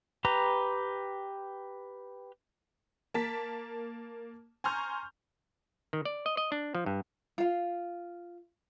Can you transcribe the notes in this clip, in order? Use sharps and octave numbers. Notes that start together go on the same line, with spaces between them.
G4 B4 A#5
A#3 A5 B6
G#5 A#5 C6 C#6 F6 G6
D#3
D5
D#5
D#5
D4
F3
G2
F4 F5